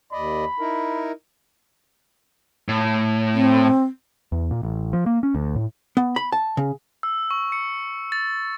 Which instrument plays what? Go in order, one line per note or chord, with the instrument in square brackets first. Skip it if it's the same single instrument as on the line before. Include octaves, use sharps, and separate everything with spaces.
[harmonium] D#2 D5 D#5 [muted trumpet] B5
[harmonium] D#4 E4 A#4
[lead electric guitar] A2
[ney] C4
[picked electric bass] E2
A#2
A1
F3
A#3
C#4
D2
A2
[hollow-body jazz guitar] B3
B5
A5
C#3
[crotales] E6
C#6
C#7
A6